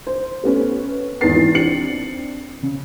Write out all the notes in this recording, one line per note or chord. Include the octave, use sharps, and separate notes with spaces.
C5
A3 B3 C#4
E2 G#2 D#3 B4 A6 C7
E3
C4 D4 C#7 F#7
C#3